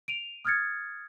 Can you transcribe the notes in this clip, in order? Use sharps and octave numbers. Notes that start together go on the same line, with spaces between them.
D7 D#7 F7
D#6 F6 F#6 G#6 A6 C#7